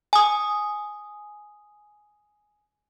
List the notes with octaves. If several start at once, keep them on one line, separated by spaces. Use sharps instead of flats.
G#5 D#6